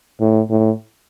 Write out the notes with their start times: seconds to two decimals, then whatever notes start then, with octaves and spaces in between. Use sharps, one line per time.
0.21 A2
0.50 A2